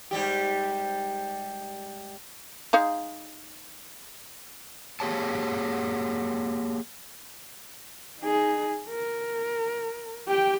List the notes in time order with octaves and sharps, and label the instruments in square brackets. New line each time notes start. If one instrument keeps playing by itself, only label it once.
[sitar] G#2 G3 G4
[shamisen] G#3 D#4 F5
[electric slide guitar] A#3 G4 G#4 C#5 A5
[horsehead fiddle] D#4 G#4
A#4
G4 G5